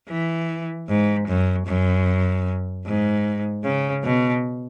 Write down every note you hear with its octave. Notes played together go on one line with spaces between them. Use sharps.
E3
G#2
F#2
F#2
G#2
C#3
B2